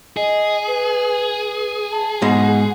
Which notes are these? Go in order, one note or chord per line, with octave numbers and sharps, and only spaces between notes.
G#4 D#5
B4
A5
G#2 B2 G#3 F#5